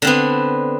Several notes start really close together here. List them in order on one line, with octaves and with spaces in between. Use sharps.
D3 C4 B3